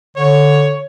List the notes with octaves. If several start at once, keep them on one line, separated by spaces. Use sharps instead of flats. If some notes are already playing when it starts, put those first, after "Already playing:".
D3 C#5